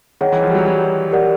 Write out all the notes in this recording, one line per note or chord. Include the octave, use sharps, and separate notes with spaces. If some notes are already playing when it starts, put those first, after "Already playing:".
D#3 G#4 C#5 F#5
E3
F3
G3
F#3
F#3
G4 A#4 D5 F#5